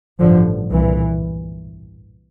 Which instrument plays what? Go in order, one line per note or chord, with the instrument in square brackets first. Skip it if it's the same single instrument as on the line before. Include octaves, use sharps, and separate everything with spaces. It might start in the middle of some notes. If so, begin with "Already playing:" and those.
[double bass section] A1 G2 D3 F3
C2 A#2 E3